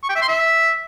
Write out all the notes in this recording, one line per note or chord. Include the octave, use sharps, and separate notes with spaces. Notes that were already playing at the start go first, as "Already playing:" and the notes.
C#6
G5
E5
C6
E5